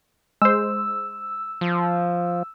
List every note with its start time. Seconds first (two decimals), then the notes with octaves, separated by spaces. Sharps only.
0.42 G#3 C5 E6
1.61 F3